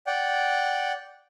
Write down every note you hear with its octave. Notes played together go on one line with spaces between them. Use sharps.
D5 F#5 G5